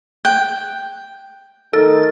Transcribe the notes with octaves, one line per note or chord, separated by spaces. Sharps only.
G5 F#6
D#3 A3 D#4 A4 A#4 A6